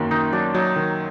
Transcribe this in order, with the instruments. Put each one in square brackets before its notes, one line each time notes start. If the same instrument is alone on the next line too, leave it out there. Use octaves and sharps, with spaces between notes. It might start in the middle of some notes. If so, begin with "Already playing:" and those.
Already playing: [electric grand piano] F#2 D#3 A#3 [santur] F#4
[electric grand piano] D#3 [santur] D#4
[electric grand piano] F#3 [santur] D4
[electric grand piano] F#3 [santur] D#4
[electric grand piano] D#3